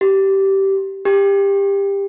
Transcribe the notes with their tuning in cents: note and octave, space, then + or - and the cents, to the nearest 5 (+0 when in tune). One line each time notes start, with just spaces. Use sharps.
G4 -15
G4 +20